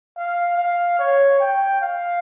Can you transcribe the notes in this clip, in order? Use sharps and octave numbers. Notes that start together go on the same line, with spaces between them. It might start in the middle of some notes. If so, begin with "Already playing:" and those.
F5
F5
C#5
G5
F5